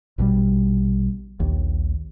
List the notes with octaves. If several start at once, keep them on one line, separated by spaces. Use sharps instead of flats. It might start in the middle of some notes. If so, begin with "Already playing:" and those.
A#1 B2 E3 G3
A#1 D#2